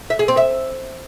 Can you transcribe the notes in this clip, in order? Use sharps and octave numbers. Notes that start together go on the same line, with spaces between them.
E5
G#4
C4
E5